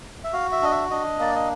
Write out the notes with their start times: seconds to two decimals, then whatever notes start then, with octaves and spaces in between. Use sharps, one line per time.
0.24 E5
0.33 F#4 F5
0.52 E5
0.62 D4 D#5
0.71 E5
0.91 D4 D#5
1.19 A#3 D5
1.35 D#5